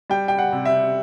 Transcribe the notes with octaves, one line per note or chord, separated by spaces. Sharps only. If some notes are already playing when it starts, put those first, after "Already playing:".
G3 G5
G5
F#5
C3
E5